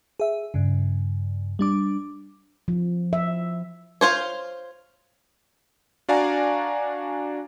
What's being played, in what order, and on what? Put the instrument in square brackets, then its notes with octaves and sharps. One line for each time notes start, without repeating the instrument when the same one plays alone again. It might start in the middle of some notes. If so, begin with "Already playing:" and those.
[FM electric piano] G#4 E5
G2 C#3
G3 D4 D6
[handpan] F3
E5
[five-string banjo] F4 C5 C#5
[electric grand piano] D4 F#4 D5 F5 G#5 A#5